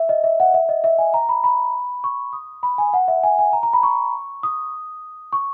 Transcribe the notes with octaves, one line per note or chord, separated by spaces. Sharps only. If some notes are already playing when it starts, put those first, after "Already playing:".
Already playing: E5
D#5
E5
F#5
E5
D#5
E5
G#5
A#5
B5
B5
C#6
D#6
B5
G#5
F#5
E5
G#5
G#5
A#5
A#5
B5
C#6
D#6
C#6